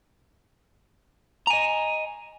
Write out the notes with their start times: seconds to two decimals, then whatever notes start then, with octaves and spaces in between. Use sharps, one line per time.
1.47 A#5
1.50 G#5
1.53 D#5